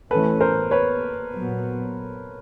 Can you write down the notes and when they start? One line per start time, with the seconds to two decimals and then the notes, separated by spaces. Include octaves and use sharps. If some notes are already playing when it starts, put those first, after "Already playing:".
0.11 A2 E3 A3 C#4 A4 B4
0.41 A#4 C5
0.71 B4 C#5
1.32 A#2 F#3 B3